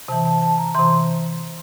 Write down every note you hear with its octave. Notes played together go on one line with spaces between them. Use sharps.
C3 E3 A5
A5
A5
A#5
C3 E3 C6